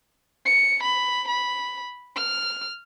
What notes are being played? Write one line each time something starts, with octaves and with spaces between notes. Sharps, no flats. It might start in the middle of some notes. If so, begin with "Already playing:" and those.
C#7
B5
B5
F6